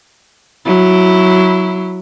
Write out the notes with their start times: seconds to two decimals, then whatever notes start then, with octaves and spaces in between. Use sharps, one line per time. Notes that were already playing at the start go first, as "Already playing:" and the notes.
0.66 F#3 E4